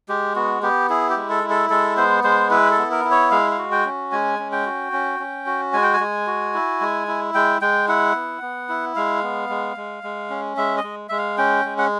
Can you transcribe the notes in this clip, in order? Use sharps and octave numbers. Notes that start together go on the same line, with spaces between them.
G#3 G4
B3 F#4
B3 G4
E4 G#4
G4
G#3
A4
E4
A4
G#3 A4
B3 C5
G#3 C5
E4 B4
A4
B3
A#4
E4
C#5
G#3 F5
F5
F#4
G5
C#4
G#3 G#5
C#4
G5
F#4
C#4
C#4
F#4
G#3 G#5
G5
G#5
G#3
F#4
E4
G#3
E4
G#3 G5
G#3 G5
E4 F#5
B3
B3
E4
G#3 F5
B3
G#3
G#3
G#3
C#4
G#3 E5
D#5
G#3
G#3 E5
F5
C#4 G5
G#3
F#5